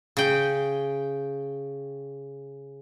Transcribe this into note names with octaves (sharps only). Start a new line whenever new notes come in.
C#3 G5